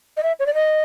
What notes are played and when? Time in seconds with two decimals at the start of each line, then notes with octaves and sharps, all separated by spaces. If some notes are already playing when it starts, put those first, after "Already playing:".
0.17 D#5
0.23 E5
0.39 C#5
0.46 D5
0.54 D#5